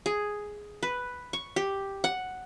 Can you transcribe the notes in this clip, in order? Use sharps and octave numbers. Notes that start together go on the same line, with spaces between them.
G#4
B4
C#6
G4
F#5